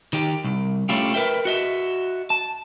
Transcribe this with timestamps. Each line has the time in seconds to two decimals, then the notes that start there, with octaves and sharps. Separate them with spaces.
0.13 D#3 G4
0.44 C2
0.89 A3 C#4 D4 E4 F4 G4
1.14 A#4 B4 E5 G5
1.45 F#4 D#5 E5
2.30 A5